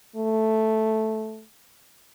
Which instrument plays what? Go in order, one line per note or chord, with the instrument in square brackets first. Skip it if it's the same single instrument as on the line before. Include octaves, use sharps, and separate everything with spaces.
[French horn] A3